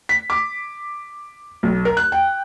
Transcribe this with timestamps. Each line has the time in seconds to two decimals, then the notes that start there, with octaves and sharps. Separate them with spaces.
0.09 B6
0.30 D6
1.63 B1
1.85 A#4
1.97 F#6
2.12 G5